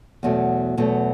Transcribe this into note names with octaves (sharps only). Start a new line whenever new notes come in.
E2 B2 F#3 A3
E2 B2 F#3 A3